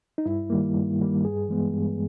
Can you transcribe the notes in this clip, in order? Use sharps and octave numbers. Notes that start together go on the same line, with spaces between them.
D#4
G2 E4
D#3 G3 A#3
G2
D#3 G3 A#3
G2 G#4
E3 G#3 B3
G2